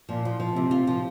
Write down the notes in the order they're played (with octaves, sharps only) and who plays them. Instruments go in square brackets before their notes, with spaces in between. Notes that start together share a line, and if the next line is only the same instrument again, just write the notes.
[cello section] A#2 [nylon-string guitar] F3
[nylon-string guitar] F3
F3
[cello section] C3 [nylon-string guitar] C4
[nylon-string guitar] F4
F3